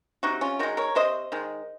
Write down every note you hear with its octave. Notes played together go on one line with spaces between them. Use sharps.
C3 D#4 F#4
C#4 F4
D#3 G#3 F#4 A#4
A#4 C#5
C3 C5 D#5
D#3 G#3